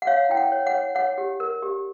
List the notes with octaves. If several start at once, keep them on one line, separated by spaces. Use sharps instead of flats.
F#5
C#5 F5
E4 G5
F#5
C#5
F#5
C#5
C#5 F#5
G4
A#4
G4